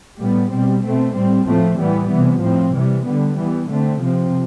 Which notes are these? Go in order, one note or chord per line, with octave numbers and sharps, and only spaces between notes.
A2 G3 B3
B2 G3 C4
B2 A3 C4
A2 G3 C4
A2 F3 A3 C4
A2 E3 G3 B3
C3 E3 B3
A2 F3 C4
C3 E3 G3
D3 G3 B3
E3 G3 B3
D3 A3 C4
C3 F3 C4